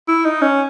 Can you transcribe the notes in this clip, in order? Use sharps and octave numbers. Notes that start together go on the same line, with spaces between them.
E4
D#4
C#4